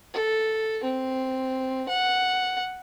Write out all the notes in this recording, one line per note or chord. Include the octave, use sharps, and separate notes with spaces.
A4
C4
F#5